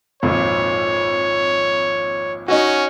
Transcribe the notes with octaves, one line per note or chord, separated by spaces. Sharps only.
G#1 F2 A#2 C#5
C#4 D#4 F#4